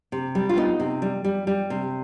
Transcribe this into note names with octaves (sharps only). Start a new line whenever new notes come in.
C3
G3
F4
B3 D#4
C3
G3
G3
G3
C3